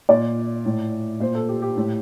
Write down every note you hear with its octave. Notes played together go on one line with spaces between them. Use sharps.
A#2 D5
A2
A#2 C5
A4
G4
G4
A2